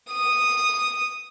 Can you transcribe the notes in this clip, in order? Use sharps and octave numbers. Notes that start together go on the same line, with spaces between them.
D#6